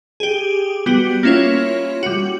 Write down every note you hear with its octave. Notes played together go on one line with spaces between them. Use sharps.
G4 G#4
G3 B3 F#4 G4
A#3 C#4 E4 F4 C#5
G3 F#4